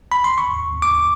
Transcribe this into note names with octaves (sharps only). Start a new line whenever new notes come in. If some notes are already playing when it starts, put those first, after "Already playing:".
B5
C6
C#6
D6